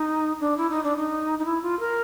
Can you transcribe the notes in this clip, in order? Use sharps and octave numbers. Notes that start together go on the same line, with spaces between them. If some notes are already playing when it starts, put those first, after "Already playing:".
Already playing: D#4
D4
E4
D#4
D4
D#4
D#4
E4
F4
A#4